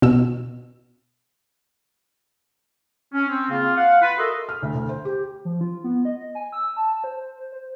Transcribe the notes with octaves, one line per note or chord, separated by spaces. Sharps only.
B2 E6
C#4
C4
C#3 A#3 C4 F4
F5 F#5
F4 B4
F#4 A4 A#4 D#5 E5 C6
F6
D2
D2
C5
G4
F3
F4
B3
D#5
G#5
E6
A5
C5
C5